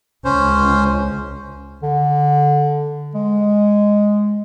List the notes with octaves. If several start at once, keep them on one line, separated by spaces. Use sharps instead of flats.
C#2 C#4 C5
D3
G#3